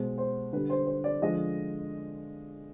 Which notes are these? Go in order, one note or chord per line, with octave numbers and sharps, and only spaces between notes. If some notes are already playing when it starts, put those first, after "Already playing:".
Already playing: B2 G#3 C5
C5
D3 G3 B4
C5
C5
D5
D3 F3 G#3 D#5